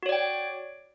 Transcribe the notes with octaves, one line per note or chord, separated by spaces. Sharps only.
F#4 C#5 D5 G5